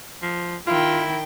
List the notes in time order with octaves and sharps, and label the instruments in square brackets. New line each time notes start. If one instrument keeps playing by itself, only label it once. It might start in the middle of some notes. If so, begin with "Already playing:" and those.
[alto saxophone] F3
[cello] D#3 G5 [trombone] E4 [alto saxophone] F4